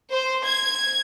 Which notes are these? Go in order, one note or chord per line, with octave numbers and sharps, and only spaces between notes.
C5
G#6